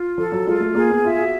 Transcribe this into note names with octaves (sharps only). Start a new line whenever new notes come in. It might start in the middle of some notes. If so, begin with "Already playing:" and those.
Already playing: F4
F3 A4
F#3
G#3 F4
A3
A#3 G#4
B3
F4 E5
F#4